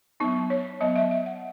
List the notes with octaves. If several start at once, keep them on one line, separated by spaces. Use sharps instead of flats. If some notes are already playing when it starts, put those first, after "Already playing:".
F#3 B3 D#4
C#5
F#3 B3 D#5
E5
E5
F#5